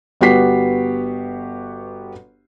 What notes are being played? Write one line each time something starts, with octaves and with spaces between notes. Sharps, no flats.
G1 B3 F#4 G4 B6 C7